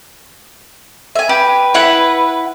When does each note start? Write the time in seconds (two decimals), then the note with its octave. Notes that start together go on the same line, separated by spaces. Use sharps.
1.15 E5 G#5
1.29 G4 B4
1.74 E4 F#5 B5